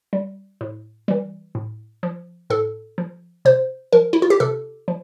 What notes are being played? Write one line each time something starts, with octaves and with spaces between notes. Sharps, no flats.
G3
A2
E3 G3
A2
F3
A2 A4
F3
C3 C5
F3 A#4
E4
F4
G4
C3 A4
F3